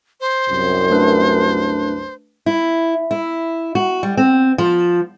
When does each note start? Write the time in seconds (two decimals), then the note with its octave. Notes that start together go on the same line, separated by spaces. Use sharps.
0.20 C5
0.49 C2 F#2
0.91 A3 D4 B4
2.46 E4
3.11 E4
3.75 F#4
4.03 G3
4.17 C4
4.58 F3